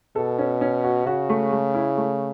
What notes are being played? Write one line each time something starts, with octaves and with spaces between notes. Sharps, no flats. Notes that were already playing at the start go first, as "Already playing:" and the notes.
B2 A4
C#4
C#4
F#4
C#3 F#4
A3
A3
E4
A3